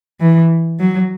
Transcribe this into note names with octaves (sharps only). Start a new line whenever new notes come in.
E3
F#3